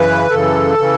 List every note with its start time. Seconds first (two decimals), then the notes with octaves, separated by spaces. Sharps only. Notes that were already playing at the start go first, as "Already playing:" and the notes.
Already playing: F#2 C#3 E3 B4
0.29 F#2 C#3 E3 A4
0.78 C#3 E3